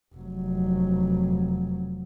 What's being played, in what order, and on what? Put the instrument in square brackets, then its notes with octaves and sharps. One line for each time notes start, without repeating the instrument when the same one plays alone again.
[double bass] F1 F#3